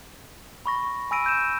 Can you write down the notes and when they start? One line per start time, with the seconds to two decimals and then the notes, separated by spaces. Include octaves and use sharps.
0.66 B5 C#6 A#6
1.11 G#5 B5 E6 A#6 D7 D#7
1.25 E6 G6 D#7 E7